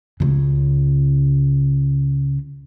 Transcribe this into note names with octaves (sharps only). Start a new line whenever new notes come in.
C#2 C#3